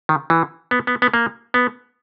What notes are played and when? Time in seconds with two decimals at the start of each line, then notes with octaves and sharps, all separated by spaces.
0.09 D#3
0.30 E3
0.71 B3
0.87 B3
1.02 B3
1.14 A#3
1.54 B3